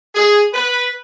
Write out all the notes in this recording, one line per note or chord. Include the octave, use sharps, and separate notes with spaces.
G#4
B4